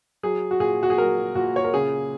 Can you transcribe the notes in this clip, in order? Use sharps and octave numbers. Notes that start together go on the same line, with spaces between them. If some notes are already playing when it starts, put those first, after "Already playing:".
F#3 G#4
F#4
A#2 G#4
F#4
G#4
F#3 A#4
A#2 F#4
C#5
A#4
C#3 G#4